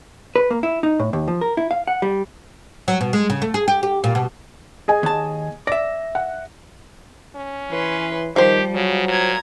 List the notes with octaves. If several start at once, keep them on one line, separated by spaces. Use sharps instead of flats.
B4
A#3
E4
D#4
A2
D#2
F3
A#4
E4
F5
F#5
G3
F#3
B2
G#3
C#3
A3
G#4
G4
G4
A#2
B2
G#4 D#5 G#5
D#2 A5
D5 E5 A#6
F#5
C#4
E3 B4 C#5 C6
D#3 F3 G3 G4 C5
C#3 F#3
A#2 A#5 G#6